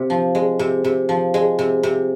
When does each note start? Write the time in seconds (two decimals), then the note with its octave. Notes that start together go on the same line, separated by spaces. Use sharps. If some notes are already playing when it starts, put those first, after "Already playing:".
Already playing: C3
0.10 F3
0.35 G#3
0.59 C3
0.84 C3
1.09 F3
1.34 G#3
1.59 C3
1.83 C3